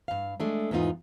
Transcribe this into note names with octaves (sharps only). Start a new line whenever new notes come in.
G2 F5
G#3 A3 D4
E2 G#2 B3 D#4 F4